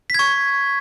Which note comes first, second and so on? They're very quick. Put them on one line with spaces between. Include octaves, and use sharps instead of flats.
B6 G#6 C#6